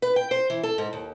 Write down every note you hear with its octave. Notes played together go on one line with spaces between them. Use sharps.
B4
G5
C5
E3
A4
G#2
D#2